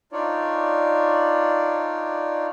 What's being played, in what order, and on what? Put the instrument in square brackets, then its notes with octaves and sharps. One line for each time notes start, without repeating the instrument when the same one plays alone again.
[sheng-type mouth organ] D4 D#4 F4 C#5 D5